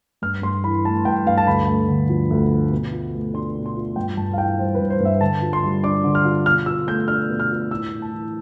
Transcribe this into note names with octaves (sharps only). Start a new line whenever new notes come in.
G2 F6
G2 C6
E3 B5
A3 A5
G2 G5
G2 F5
A5
D2 B5
A3
D3
F3
D2
A3
B2
F4
A3
D4 C6
B2
C6
F4
G2 G5
G2 A5
F5
E3 G5
G3 C5
B4
G2
C5
G2 E5
D3 A5
F4
C6
G3
D4 D6
D3
F6
F4
B2 F6
F4 E6
A3 G6
D4 F6
B2
F6
F4
A2 E6
A2
A5
E3